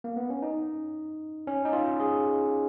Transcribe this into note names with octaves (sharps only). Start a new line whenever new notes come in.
A#3
B3
C#4
D#4
C#4
D#4
F4
G#4